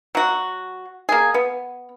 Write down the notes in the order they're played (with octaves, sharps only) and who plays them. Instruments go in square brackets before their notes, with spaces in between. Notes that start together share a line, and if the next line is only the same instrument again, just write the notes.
[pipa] F#3 F#4
A#3 G#4
B3